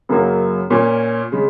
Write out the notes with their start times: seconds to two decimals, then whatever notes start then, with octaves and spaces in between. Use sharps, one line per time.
0.09 F#2 C#3 F#3 A#3
0.70 A#2 A#3 C#4
1.32 C#3 G#3